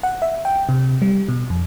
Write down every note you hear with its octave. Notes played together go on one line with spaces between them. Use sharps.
F#5
E5
G5
C3
G3
B2
F2